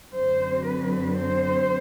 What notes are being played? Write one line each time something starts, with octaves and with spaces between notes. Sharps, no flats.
F#2 D3 F#3 C4 C5
B4
C5